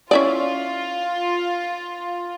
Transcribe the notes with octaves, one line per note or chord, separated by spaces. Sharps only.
C#4 E4 F4 D5